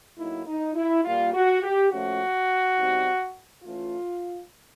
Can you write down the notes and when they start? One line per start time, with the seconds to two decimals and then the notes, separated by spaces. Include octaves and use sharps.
0.18 A2 F#3 A#3 D#4 E4
0.47 D#4
0.75 E4
1.04 A#2 G3 A#3 F4
1.34 F#4
1.63 G4
1.92 A#2 F3 A3 C#4 F#4
2.78 B2 G3 C4 D#4
3.64 E3 A3 C#4 F4